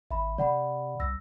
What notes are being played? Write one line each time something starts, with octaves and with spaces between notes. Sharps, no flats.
G#1 E5 B5
C3 D5 F#5 B5
C2 E6 A#6